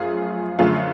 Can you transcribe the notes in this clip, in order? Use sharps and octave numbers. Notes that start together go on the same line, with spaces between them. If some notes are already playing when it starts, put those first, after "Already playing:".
Already playing: F#2 F3 A3 F4 G#4
F#2 D3 F3 A3 F4 G#4